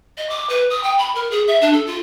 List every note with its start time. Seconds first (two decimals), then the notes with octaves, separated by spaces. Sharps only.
0.17 D#5
0.29 D6
0.49 B4
0.70 D#6
0.83 G5
0.98 B5
1.15 A#4
1.31 G#4
1.47 E5
1.61 D4
1.73 A4
1.86 F4